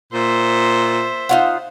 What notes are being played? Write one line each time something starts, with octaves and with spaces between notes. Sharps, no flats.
A#2 C5 E5
D#4 F4 F#5